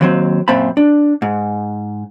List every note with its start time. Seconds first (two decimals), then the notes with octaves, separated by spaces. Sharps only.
0.01 D#2 F#3 C4
0.48 F#2 A#2 C4 F5 A5 B5
0.77 D4
1.22 G#2